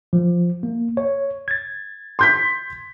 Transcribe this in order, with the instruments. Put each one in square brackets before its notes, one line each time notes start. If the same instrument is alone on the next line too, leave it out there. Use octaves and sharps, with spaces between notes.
[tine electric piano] F3
A#3
C#5
G#6 A6
[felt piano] C6 G6 B6